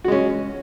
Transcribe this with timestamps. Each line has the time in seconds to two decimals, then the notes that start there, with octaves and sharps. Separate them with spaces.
0.04 F#4
0.08 G#3
0.12 C#4